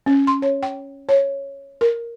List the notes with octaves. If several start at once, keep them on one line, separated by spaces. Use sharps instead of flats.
C#4
C6
C#5
G5
C#5
A#4